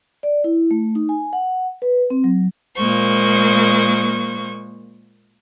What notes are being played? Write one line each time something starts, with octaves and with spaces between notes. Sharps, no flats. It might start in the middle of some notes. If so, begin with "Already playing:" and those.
D5
E4
A3
D#4
G#5
F#5
B4
C4
F#3
A#2 G#3 A#3 C5 C#6